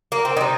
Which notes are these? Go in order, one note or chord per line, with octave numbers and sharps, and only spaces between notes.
A#3
C4
C3 G3 D#4